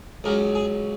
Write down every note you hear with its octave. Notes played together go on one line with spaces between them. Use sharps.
C#2 C#3 F#3 A#4
G#4